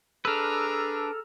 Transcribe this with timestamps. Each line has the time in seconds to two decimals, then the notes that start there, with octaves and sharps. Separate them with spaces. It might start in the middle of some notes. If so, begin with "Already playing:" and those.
0.25 D4 G#4 A4 B4 A#5 E6 F6